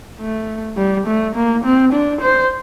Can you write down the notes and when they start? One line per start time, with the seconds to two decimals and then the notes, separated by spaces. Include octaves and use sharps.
0.21 A3
0.77 G3
1.07 A3
1.35 A#3
1.64 C4
1.93 D4
2.22 C5